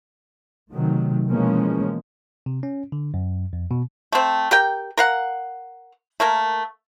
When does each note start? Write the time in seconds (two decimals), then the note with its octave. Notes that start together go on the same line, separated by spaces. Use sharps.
0.71 C3 D#3 F#3 A3
1.28 B2 E3 F3 G#3 A#3 C#4
2.46 C3
2.63 C#4
2.92 D3
3.14 F#2
3.53 F2
3.71 B2
4.12 A3 C4
4.51 G4 A#4 G5
4.97 A#4 F5 F#5
6.20 A3 A#3 A#4